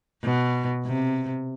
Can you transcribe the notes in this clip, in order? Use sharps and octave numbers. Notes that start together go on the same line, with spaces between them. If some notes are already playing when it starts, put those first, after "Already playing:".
B2
C3